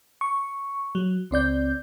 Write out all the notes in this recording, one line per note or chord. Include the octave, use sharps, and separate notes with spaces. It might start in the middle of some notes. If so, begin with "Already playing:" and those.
C#6
F#3
C#2 C4 D5 G6